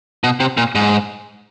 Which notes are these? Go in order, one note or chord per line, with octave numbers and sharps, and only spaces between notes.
B2
C3
A#2
G#2